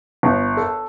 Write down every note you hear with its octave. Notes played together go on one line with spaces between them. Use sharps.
G1
A4